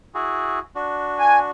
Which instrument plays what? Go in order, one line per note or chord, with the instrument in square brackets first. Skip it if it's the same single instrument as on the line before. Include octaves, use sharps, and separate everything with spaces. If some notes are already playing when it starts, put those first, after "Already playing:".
[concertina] E4 F#4 G#4
D4 F#4
[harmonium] G#5